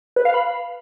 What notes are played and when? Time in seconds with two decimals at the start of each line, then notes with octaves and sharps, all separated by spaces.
0.16 B4
0.25 F5
0.34 B5